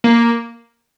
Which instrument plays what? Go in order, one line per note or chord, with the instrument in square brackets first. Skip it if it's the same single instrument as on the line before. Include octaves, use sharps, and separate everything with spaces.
[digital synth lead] A#3